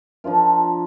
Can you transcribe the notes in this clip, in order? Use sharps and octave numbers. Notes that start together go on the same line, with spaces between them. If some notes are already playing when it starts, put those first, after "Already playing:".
F3 D4 F4 A#4